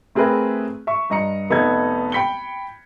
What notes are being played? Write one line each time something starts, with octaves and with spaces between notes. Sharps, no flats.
A3 C4 G#4 A#4 B4 E5
E5 C#6
G2 D#5 A#5 C#7
F1 B3 D#4 A4 G#6
G5 B5 B6 C#7 G7